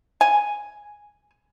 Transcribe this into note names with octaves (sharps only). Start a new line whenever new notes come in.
G#5